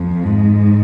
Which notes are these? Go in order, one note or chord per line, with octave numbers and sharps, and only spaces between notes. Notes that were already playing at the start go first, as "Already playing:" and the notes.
Already playing: F2
G#2